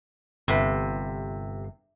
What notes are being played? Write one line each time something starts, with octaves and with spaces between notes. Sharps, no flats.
G1 C3 B4